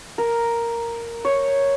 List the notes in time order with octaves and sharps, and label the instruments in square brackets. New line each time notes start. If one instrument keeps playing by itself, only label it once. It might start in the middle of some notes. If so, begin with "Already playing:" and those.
[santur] A#4
C#5